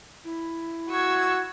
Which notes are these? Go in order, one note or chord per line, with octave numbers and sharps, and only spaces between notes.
E4
F#4 C#6 E6 G#6